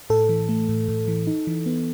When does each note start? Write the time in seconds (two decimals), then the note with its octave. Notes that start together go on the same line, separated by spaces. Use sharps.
0.10 A2 A4
0.29 E3
0.49 A3
0.69 A2
0.88 A2
1.08 E3
1.27 D#4
1.47 E3
1.66 B3